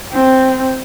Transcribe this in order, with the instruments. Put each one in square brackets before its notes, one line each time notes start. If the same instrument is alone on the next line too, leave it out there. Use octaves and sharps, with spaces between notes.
[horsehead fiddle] C4